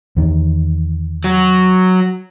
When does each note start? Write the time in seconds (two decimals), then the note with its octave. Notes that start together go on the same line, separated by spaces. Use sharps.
0.17 E2 D#3
1.24 F#3